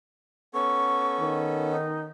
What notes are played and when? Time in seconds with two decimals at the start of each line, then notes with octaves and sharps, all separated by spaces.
0.54 B3 C#4 A4 C#6
1.20 D#3
1.70 D#4